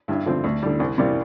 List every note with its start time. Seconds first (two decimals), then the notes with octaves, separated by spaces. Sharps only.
0.08 G2 E4
0.26 D3 F3 C4
0.44 D2
0.63 D3 G3
0.80 C2
0.98 C3 E3 G3 A#3